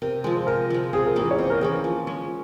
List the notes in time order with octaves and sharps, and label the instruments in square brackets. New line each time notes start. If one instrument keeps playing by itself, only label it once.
[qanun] C3 [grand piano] A#4
[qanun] F3 G#3
[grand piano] C5
[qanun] C3 [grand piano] A#4
[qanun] F3 G#3
[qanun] C3 [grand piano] G#4
[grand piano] A#4
[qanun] E3 A#3 C#4 [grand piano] G#4
[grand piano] C#5
[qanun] C3 [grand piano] C5
[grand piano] A#4
[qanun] E3 A#3 C#4 [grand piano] G#4
[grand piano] A#4
[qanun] F3
G#3 C#4